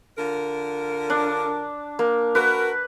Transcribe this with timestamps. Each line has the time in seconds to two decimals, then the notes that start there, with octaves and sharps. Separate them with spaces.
0.18 D3 F4 A#4
1.10 D4
1.99 A#3
2.35 F#4 A#4 B4